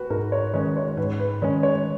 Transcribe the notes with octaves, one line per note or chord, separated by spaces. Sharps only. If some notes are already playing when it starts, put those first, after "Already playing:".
Already playing: F#4 B4
G#2 A#4
C#5
D#3 G#3 C#4 C#5
C#5
G#2 B4
B4
D#3 G#3 C#4 C#5
C#5